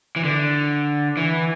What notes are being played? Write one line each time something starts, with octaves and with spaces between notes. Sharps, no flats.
E3
D3
E3